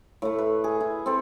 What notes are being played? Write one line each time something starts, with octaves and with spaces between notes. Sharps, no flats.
A2 A3
B4
G#4
E4
C4 A4